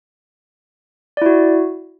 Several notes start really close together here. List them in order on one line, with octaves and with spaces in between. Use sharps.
D5 E4 F#4